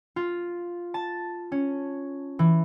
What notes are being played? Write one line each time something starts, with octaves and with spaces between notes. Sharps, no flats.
F4
A5
C#4
E3